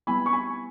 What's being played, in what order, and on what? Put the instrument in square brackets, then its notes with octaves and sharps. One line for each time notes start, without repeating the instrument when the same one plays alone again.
[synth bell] G3 B3 E4 [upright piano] G#5 B5
[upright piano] C#6
G#5 B5